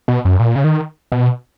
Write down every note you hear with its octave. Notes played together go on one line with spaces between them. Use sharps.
B2
F#2
A#2
C#3
D#3
B2